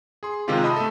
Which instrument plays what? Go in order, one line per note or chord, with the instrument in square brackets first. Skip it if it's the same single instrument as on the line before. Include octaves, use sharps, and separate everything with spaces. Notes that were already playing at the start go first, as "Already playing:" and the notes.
[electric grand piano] G#4 C6
C3 D#3 G#3 C4 F4 G4
D#5 E5 A5 B5 D#6
A3 A4